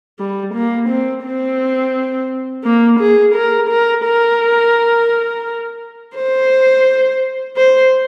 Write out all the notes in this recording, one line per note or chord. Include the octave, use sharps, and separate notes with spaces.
G3
A#3
C4
C4
A#3
G#4
A#4
A#4
A#4
C5
C5